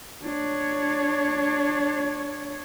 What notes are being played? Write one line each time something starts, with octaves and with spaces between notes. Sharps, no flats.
D4 C#5